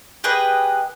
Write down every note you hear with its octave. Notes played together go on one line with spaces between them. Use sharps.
G4 G#4 B4 D#5